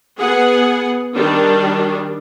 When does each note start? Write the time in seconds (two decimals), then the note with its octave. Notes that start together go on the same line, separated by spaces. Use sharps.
0.20 B3 G#4 F#5
1.14 D#3 G3 D4